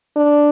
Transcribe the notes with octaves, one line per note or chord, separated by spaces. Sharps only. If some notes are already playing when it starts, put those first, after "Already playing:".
D4